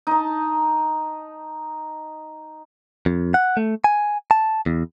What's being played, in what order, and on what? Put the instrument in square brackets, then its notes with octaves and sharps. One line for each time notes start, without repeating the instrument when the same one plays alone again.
[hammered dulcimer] D#4 A5
[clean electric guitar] F2
F#5
A3
G#5
A5
E2